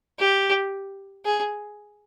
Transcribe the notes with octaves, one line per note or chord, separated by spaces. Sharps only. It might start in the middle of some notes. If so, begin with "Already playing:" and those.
G4
G#4